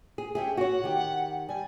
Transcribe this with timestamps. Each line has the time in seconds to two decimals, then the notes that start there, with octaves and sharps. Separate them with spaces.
0.18 G#4
0.35 C#4 G4 G#4 E5
0.57 F#4 C#5 F#5
0.83 D#3 G4
1.49 G3 G#5